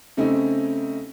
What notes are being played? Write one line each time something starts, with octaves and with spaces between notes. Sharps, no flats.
C#3 A3 C4 C#4 D#4 G4